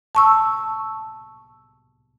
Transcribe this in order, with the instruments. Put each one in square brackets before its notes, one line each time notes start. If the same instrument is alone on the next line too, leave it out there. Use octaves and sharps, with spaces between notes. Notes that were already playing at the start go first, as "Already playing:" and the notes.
[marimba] A5 C#6 E6